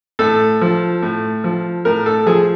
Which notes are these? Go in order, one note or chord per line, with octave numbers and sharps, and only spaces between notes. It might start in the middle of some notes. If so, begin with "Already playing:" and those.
A2 A4
F3
A2
F3
A2 A#4
A4
F3 G#4